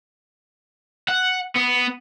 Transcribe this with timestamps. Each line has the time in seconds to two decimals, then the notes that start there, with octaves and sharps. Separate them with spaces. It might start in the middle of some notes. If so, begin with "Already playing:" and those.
1.09 F#5
1.56 B3